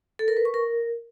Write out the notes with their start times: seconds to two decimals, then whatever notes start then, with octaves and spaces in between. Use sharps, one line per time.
0.19 A4
0.28 A#4
0.37 B4
0.45 C#6
0.54 A#4